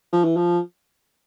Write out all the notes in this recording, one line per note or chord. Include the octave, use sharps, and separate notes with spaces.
F3
E3
F3